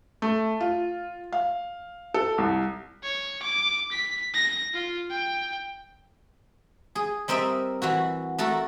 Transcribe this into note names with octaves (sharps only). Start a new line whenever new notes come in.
A3
F4
F5
A4
C2
C#5
D6
B6
A#6
F4
G5
G#4
G3 C4 A#4 D#5 E5
E3 E4 F#4
A3 F#4 A4 A#4